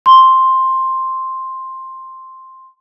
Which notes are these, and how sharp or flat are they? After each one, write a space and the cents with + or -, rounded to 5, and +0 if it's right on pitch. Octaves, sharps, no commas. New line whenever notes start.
C6 +5